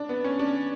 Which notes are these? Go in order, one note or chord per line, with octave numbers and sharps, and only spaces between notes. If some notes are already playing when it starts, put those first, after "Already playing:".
Already playing: D4
B3
C#4
D4